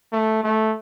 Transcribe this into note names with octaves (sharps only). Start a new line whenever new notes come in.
A3
A3